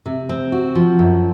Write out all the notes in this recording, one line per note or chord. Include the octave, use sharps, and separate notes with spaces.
C3
C4
F#4
F3
F#2